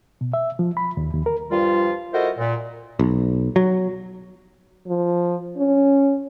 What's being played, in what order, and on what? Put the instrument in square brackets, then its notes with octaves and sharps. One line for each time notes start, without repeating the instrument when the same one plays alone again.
[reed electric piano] B2
E5
F3
B5
D#2
D#2
A#4
[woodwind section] G2 F3 G3 F4
E4 F#4 A4 A#4 C5 D#5
A#2
[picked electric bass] B1
F#3
[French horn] F3
C#4